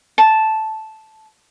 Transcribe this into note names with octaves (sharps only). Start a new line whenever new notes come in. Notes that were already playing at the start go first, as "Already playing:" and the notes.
A5